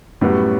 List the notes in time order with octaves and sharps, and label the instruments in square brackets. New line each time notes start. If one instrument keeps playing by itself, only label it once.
[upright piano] F#2 F#3 [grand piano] A2 G3 B3 F#4